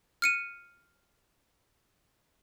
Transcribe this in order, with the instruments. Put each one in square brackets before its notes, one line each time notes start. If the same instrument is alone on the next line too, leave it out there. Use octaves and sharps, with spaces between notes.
[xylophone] F6 C#7 D#7